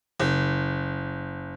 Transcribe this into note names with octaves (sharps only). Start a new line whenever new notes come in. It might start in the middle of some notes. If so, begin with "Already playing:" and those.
F#1